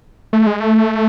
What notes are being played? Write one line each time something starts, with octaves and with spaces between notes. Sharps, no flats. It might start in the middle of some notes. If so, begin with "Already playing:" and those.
A3
G#3
A3